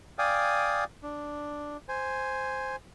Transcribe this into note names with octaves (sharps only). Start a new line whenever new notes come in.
D5 F5 G5 G#5 D#6
D4
C5 G#5